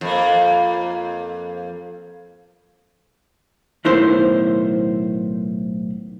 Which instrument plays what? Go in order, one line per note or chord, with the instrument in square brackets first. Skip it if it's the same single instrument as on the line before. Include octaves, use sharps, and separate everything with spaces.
[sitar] F2 A#3
[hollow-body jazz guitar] B1 A2 D#3 B3 E4 C5